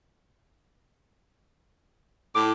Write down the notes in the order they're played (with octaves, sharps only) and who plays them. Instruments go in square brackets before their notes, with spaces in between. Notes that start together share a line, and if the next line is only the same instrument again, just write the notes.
[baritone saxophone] A2 [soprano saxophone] D6